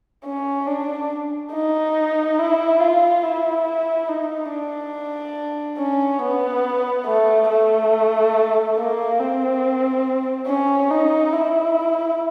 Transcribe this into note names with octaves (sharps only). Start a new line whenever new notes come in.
C#4
D4
D#4
E4
F4
E4
D#4
D4
C#4
B3
A3
A3
A#3
C4
C#4
D#4
E4